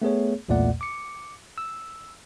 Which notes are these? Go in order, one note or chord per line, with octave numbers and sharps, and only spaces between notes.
A3 B3 G#4 C#5
B1 E2 A#2 A3 D5 F#5
D6 C#7
E6